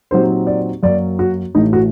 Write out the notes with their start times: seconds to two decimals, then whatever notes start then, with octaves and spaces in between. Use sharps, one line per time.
0.11 A#2 F#3 C4 D#4 G4 C5
0.47 D5
0.83 F#2 F#3 A#3 D5
1.19 F#4
1.55 A1 A2 A3 D#4
1.73 F#4